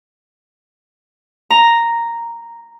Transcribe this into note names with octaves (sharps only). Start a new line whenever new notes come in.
A#5